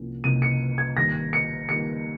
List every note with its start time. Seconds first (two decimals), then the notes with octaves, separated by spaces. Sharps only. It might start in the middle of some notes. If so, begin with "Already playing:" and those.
Already playing: C2 C3 F3 A#3 C#4
0.23 C2 C3 F3 A#3 C#4 D#7
0.42 C#7
0.78 G#6
0.97 G#1 G2 D#3 G3 A#3 A#6
1.33 C#7
1.69 D#3 G3 A#3 C#7